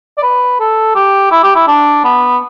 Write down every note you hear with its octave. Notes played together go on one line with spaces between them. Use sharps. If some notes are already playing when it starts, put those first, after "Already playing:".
D5
B4
A4
G4
E4
G4
E4
D4
B3